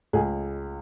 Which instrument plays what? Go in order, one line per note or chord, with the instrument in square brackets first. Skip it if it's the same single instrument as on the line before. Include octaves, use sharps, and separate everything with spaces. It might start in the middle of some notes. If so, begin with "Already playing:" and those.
[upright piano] C#2 G#4